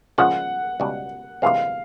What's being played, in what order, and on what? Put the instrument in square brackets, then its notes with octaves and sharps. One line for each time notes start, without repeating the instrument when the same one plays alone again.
[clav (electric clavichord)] C#3 F3 G#3 C#4 F4 [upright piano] F#5
[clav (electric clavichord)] C#2 B2 G3
[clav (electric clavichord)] D2 C3 E3 G#3 C4 [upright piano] F5